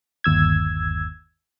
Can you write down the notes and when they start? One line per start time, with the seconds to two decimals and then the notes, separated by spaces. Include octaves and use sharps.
0.24 G1 D#2 E6 G#6